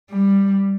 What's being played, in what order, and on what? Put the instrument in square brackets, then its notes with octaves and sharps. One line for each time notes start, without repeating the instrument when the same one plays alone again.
[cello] G3